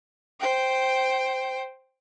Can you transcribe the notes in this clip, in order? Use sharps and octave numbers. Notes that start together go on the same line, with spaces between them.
C5 G5